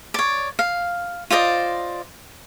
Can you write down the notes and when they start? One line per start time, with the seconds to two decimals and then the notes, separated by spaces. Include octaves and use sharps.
0.14 C#5 D5
0.59 F5
1.30 F4 C5 D5 D#5